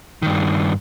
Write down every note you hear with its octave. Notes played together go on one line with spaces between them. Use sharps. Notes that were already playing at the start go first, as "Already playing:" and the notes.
G2 D#3